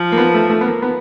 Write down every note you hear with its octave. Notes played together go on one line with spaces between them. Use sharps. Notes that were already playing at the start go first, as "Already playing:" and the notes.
Already playing: F3
A#3
B3
A3
A3
B3
A#3
B3